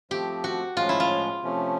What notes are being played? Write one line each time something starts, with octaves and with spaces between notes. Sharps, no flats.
F3 A3 C4 G4
F#4
A2 F3 G#3 C#4 F4
E4
F4
C3 F3 A3 C#4